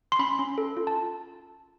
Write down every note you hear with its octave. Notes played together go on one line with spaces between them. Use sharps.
C6
C#4 B5
C#4
A4
F4
A5